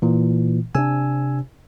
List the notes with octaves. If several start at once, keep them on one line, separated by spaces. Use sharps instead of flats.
A#2 E3
C3 D4 G#5 E6